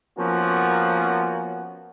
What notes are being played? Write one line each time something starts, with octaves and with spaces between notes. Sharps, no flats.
F3 A#3 B3 C#4 F#4